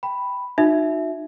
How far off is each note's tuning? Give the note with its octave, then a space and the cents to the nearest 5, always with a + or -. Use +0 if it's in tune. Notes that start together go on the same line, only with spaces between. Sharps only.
G5 +0 B5 +0
D#4 -25 F#4 -35 E5 +0